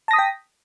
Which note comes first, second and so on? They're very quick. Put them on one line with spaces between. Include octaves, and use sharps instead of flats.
A5 A#6 D#6 B6 G5